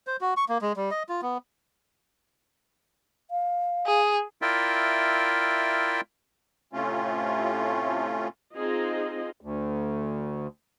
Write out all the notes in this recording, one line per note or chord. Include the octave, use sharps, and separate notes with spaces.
C5
F#4
C#6
A#3
G#3
G3
D#5
F4
B3
F5
G#4
E4 F4 A#4 D5 E5 G5
A2 C3 A3 C#4 F4
C4 D#4 F4 G#4 D#5
D2